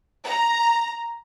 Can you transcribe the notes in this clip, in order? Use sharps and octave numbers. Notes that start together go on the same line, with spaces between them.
A#5